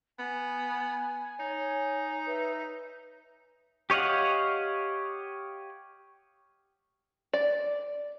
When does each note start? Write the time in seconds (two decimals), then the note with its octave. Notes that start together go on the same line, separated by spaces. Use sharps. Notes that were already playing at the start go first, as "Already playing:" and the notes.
0.19 B3 G#5
1.40 D#4 C#5
2.27 B4 E5
3.90 G4 C#5 D#5 F5 F#5
7.33 D5